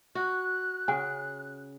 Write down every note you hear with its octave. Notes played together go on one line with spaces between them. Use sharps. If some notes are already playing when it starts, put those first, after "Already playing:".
F#4 F#6
C#3 F#5 G#5